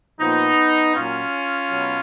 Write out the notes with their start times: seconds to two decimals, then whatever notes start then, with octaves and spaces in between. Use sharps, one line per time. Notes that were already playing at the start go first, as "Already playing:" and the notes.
0.20 A#2 F3 B3 D#4
0.94 A#2 F#3 C#4 F4
1.70 B2 F#3